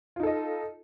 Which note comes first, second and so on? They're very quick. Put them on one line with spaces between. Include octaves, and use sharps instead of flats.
F4 D#4 A4 D#5